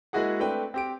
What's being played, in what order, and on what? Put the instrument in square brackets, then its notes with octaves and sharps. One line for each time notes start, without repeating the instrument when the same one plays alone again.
[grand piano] G#3 A#3 E4 F#4 G#4 F#5
A3 C4 D4 B4 G5
C4 G4 D7